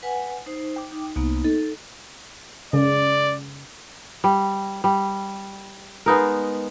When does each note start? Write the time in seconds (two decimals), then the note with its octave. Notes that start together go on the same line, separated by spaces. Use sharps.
0.03 B4 F#5 G#5
0.46 D#4 C5
0.76 G5 D6
0.92 D#4
1.16 C2 A#3 B3 D#4
1.44 D#4 A4
2.73 C#3 D5
4.24 G3
4.84 G3
6.06 G#3 B3 D#4 A#4